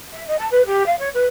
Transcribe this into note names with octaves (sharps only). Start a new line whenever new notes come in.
E5
D#5
A5
B4
G4
F5
C#5
B4